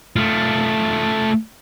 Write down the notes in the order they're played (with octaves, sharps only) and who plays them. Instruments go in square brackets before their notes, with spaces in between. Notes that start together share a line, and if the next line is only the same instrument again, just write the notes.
[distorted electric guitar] A3 F4